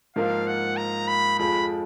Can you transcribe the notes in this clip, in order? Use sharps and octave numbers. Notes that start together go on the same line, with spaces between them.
G#2 F3 A#3 F4 A#4 F5
F#5
A#5
B5
F2 F3 G#3 B5